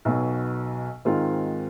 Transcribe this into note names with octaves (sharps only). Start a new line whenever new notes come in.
B1 B2 F#3
G#2 D#3 G#3 C4 F4